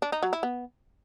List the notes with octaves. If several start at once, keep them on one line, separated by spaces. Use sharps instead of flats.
D4
D#4
F#3
E4
B3